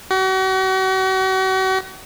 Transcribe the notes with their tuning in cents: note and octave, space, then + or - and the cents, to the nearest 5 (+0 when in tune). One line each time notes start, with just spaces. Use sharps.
F#4 +40